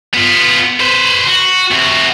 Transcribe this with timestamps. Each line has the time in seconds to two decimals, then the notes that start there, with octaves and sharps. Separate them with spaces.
0.14 B3 F4
0.80 B4 C5
1.26 F#4
1.71 C3 F#4